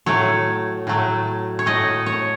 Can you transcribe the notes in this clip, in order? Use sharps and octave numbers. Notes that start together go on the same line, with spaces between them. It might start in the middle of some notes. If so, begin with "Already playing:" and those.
A2 F#3 A3 C#5
A2 F#3 A3
C#5
A2 A3 D#5
C#5